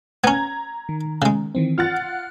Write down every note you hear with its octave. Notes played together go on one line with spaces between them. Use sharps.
B3 C#4 A#5 G#6
D#3
C#3 G#3
D#3 E3 C4
F4 F#5 F6 F#6 A6